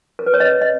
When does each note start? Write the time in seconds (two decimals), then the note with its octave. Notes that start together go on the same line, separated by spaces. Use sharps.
0.19 A#4
0.26 B4
0.34 C#5
0.40 D#5
0.61 D#5